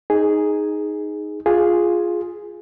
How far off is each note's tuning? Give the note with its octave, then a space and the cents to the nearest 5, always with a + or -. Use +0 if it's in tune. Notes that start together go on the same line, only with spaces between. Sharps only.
D#4 +0 G#4 +0
F4 +0 G#4 +0